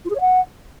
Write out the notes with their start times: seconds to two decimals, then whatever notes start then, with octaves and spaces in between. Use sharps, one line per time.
0.05 F4
0.10 G#4
0.15 C#5
0.20 F#5